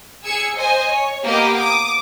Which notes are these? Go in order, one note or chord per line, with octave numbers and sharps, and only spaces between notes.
G#4 E6 G#6 C#7
C5 D#5 G#5
C#5
A#3 B3 G4 D#5 D6
D6 D#6